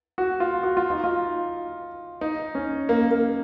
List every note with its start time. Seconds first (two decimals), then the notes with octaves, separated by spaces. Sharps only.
0.18 F#4
0.40 F4
0.63 F#4
0.77 F4
0.90 D#4
1.04 F4
2.21 D#4
2.55 C#4
2.89 A#3
3.11 A#3